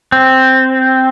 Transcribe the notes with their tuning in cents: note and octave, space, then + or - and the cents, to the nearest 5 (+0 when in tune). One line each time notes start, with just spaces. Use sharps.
C4 +0